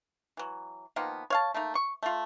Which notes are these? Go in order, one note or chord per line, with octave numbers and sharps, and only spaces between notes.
E3 F#3
D#3 F3 A#3 B3
C#5 F5 A5
A3 A#3 D#4
C#6
A3 F4